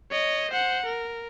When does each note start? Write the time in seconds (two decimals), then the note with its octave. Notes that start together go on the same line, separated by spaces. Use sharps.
0.11 C#5 D#5
0.51 C5 F#5
0.86 A#4